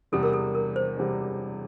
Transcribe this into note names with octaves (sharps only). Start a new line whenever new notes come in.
E1 E2 C3 G3 A4
A#4
A4
A#4
C5
E1 E2 C3 G3